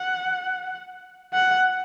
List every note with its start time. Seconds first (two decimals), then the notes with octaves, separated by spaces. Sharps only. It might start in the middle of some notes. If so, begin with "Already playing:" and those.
Already playing: F#5
1.33 F#5